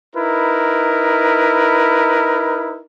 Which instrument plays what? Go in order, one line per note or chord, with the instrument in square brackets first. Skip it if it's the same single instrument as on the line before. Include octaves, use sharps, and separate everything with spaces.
[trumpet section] D#4 E4 A#4 B4